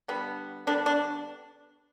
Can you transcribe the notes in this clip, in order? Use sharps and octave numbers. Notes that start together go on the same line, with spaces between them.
D3 G3 B3
D3 G3 B3 D4
D4